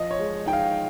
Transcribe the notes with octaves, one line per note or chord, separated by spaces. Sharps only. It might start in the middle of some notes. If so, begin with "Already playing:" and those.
Already playing: F3 D#5
C#5
G#3
D#4 G5
F5